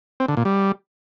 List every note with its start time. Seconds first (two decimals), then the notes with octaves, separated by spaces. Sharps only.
0.20 C4
0.28 D3
0.37 A#2
0.45 G3